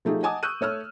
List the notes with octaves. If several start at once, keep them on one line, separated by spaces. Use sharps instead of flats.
F3 A3 D#4 G4 G#4
D#5 F#5 G#5 A5 D6 D#6
C#6 E6 F#6 G6 D#7
A3 C#5 E6 F6